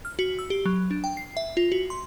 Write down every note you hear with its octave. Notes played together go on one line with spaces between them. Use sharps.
F6
F#4
E6
G4
F#3
D4
G5
C7
E5
F4
F#4
C6